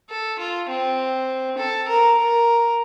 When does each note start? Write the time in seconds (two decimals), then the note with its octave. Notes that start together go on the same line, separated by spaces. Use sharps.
0.10 A4
0.39 F4
0.69 C4
1.58 A4
1.88 A#4
2.18 A#4